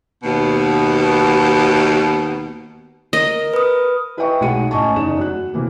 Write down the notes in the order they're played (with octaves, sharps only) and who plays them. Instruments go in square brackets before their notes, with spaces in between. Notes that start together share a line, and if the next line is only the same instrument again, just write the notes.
[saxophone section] D#2 B2
[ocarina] A#4 [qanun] D#5
[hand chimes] B4 D#6
[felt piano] E4 B4 D#5 E5 G5 C#6
B1 G#3 D#4 F#4 C#7 D#7
A1 C#4 D#5 G#5 A5 C#6
F#1 E2 D#4 E7
F#3 F#6
C3 E3 A#3